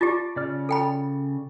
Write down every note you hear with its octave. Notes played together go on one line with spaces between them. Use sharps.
F4 G4 D5 A5
C#3 D5 F6
A4 G5 B5